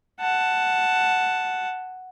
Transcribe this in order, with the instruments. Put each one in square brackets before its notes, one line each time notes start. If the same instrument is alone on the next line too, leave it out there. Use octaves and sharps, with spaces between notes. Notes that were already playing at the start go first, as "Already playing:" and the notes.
[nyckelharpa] F#5 A5